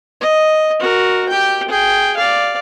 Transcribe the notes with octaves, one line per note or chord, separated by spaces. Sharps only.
D#5
F#4 A#4
G4 G5
G#4 G5
D5 F5